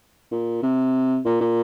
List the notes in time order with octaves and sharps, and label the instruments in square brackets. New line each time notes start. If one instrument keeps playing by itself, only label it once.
[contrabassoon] A#2
C3
A#2
A#2